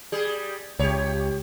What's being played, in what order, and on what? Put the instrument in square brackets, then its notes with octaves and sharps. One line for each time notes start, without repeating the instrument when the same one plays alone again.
[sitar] G3 G#4
[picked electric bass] C#2 [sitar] G4 C#5